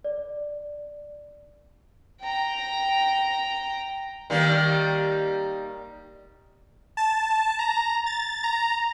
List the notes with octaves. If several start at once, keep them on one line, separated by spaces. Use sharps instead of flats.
D5
G5 A#5
D#3 G3 A#3
A5
A#5
A6
A#5